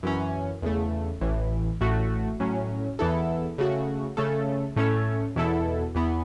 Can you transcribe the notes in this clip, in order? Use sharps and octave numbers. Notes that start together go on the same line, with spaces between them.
F#2 E3 C#4
E2 C#3 A3
A1 A2 E3
A1 A2 A3 F#4
A2 F#3 C#4
E2 E3 B3 E4 A4
C#3 A3 F#4
C#3 A3 C#4 A4
A2 A3 C#4 A4 C#5
E2 B2 B3 E4 A4
E2 E3 B3